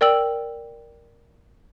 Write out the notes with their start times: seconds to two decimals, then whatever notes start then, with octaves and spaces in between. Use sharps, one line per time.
0.01 A#4 D5 G5 E6 F#7